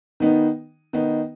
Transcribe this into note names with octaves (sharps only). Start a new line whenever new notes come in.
D#3 B3 D#4
D#3 B3 D#4